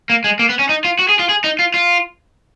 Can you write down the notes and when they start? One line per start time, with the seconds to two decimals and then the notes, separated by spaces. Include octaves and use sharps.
0.10 A#3
0.24 G#3
0.39 A#3
0.49 B3
0.59 C#4
0.69 D#4
0.84 F4
0.99 F#4
1.09 G#4
1.19 F4
1.29 G#4
1.44 D#4
1.59 F4
1.74 F4